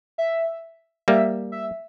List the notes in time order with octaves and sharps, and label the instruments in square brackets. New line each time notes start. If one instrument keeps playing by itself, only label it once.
[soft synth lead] E5
[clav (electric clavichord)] G3 A#3 [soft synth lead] E5
[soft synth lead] E5